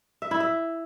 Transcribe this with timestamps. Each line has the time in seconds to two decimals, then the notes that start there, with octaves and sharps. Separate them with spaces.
0.22 E5
0.31 E4
0.40 E5